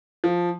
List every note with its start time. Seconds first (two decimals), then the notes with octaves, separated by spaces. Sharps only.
0.24 F3